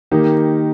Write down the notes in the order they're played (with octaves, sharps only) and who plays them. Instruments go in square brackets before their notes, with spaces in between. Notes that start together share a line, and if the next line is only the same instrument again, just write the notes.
[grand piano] D#3 A#3 D#4 G4